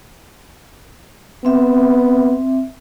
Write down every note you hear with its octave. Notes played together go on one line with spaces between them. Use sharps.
B3 C4 E5